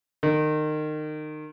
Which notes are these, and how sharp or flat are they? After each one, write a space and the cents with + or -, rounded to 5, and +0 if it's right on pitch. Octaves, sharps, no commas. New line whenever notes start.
D#3 -25